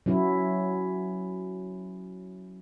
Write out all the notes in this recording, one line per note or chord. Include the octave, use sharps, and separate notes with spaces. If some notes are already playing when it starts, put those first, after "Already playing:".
F#3 C#4 E4